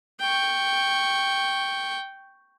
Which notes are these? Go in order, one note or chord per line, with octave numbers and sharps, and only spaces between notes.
G5 C#6